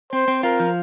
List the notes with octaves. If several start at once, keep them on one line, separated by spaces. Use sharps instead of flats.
C4 C5
C4
F4 A#4
F3